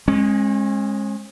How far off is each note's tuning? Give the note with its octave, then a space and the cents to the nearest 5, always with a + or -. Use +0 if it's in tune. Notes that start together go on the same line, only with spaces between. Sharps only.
G#3 +0 C#4 -40